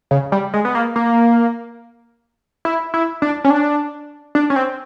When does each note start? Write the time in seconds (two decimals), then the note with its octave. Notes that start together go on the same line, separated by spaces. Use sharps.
0.11 C#3
0.32 G3
0.54 G#3
0.65 B3
0.75 A#3
0.96 A#3
2.65 E4
2.94 E4
3.22 D4
3.44 C#4
3.50 D4
4.35 D4
4.50 C#4
4.56 C4